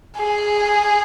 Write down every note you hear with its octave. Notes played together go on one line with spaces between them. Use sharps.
G#4